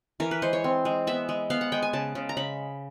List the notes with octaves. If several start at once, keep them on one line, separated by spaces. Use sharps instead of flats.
E3 A#4
B4
G#3 C5
C#5
C4
G#3
B3 E5
G#3
B3 F5
F#5
G#3 G5
G#5
C#3 A5
C#3
A#5
C#3 B5